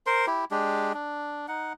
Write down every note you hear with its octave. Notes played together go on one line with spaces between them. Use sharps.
A#4 C5 C6
E4 G4
G#3 D4 G4
D4
D#4 F#5